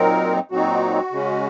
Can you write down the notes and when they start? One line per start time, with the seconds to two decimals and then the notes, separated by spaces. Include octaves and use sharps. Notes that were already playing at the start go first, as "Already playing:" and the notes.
Already playing: A#2 F#3 C4 D#4 A#4
0.51 A#2 F#3 C4 D#4 F#4
1.12 C#3 G#3 C#4